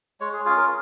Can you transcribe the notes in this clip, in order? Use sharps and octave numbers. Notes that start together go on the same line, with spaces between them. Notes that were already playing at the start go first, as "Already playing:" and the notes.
G#3 C#5
G#4
C#4 F4 G#4
A#4